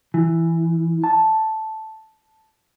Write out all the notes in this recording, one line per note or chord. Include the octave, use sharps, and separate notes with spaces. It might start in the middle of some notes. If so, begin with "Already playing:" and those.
E3
A5